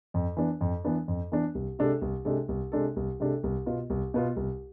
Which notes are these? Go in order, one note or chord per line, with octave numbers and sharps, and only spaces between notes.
F2
E3 B3 D4
F2
E3 B3 D4
F2
E3 B3 D4
C2
C3 G#3 D4 A4
C2
C3 G#3 D4 A4
C2
C3 G#3 D4 A4
C2
C3 G#3 D4 A4
C2
B2 B3 F4
C2
B2 B3 F4
C2